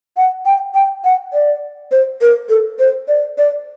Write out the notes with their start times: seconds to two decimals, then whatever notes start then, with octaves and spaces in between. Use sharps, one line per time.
0.17 F#5
0.45 G5
0.75 G5
1.04 F#5
1.33 D5
1.92 C5
2.21 A#4
2.49 A4
2.79 C5
3.08 D5
3.38 D5